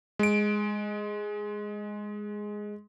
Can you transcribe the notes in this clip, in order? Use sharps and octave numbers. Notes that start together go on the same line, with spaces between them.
G#3 D7